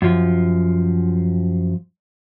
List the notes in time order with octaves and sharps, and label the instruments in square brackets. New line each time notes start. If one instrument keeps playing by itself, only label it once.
[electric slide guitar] F#2 F3